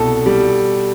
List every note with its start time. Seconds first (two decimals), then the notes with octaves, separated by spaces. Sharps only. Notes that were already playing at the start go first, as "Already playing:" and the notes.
Already playing: C2 B2 A4
0.26 G3